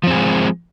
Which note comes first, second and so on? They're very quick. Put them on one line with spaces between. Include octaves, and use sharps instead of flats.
F3 C4 G#4 G#3